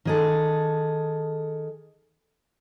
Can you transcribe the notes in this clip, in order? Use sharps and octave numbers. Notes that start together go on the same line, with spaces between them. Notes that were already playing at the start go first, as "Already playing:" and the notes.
D#3 G#4 A4